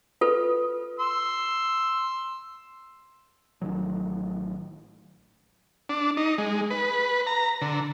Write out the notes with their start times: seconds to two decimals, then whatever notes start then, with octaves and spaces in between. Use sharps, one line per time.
0.21 F4 A4 B4
0.99 C6 E6
3.61 A1 D#3 F#3
5.89 D4
6.17 D#4
6.38 G#3
6.71 B4
7.27 A#5
7.61 D3